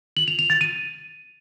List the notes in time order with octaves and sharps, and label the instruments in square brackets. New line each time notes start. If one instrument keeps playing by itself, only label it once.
[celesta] F#7
F7
F7
A6
D#7